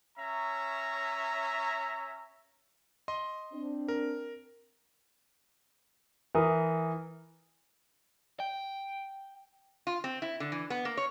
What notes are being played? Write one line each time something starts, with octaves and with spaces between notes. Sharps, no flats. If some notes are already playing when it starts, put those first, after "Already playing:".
C#4 C#5 E5 A#5
D#5 C6
C4 D4
A#4
E3 A#4 D#6
G5
F4
C4
E4
D3
E3
B3
A#3
C#5